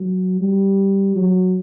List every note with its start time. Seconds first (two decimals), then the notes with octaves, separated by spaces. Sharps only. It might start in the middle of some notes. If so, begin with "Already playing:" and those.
Already playing: F#3
0.41 G3
1.15 F#3